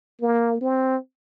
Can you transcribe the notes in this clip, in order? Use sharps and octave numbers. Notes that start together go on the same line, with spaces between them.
A#3
C4